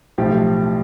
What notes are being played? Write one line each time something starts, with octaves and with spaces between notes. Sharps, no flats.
B1 A2 F3 G4